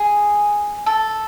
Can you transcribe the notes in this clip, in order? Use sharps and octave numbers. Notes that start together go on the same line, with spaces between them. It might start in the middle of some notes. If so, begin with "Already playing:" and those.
Already playing: G#4
A4